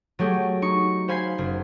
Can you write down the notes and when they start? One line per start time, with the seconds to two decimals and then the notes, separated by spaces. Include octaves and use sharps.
0.19 F#3 A3 G4 G#4
0.62 D#4 C#6
1.08 C5 F5 G#5 B5 G#6 C7
1.38 F#1